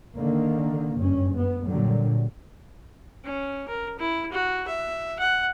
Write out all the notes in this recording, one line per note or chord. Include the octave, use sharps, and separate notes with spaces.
D3 D#3 A#3
F#1 G2 C#4
B3
A#2 D3 F#3 G3
C#4
A#4
E4
F#4
E5
F#5